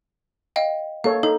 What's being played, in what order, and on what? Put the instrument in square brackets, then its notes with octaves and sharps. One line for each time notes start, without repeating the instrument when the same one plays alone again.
[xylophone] D#5 F5 G5
[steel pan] A#3 A4 C#5 [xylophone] F5
[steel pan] D#4 [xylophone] A4